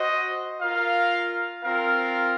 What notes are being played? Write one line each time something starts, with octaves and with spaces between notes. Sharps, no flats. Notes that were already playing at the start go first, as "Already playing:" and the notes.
Already playing: F#4 C5 D#5
F4 A#4 F5
C4 F4 A#4 F5